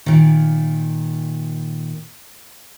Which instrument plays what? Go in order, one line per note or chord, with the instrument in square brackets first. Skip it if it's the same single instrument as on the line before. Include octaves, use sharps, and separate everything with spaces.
[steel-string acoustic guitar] A#2 D#3